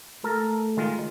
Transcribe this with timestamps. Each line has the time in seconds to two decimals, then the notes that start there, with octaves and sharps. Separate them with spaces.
0.24 A3 A4 A#4
0.77 D#3 G#3 F4